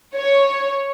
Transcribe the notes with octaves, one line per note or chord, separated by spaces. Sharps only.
C#5